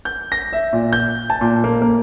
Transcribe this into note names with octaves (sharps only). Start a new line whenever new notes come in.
G6
A#6
E5
A#2
G6
A5
A#2
A#3
A#3